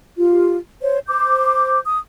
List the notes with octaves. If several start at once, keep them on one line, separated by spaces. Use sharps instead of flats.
F4 G4
C5 C#5
C5 D6 G6
D#6